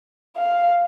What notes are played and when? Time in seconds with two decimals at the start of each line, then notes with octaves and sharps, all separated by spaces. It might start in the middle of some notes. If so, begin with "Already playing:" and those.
0.37 F5